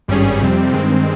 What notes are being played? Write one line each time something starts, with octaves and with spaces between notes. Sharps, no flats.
G#1 G2 G3 C#4 G#4
F2 C3 G3 C4
G2 D#3 G#3 C4